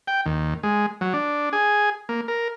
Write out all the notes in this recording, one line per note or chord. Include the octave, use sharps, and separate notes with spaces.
G5
D#2
G#3
F#3
D4
G#4
A#3
A#4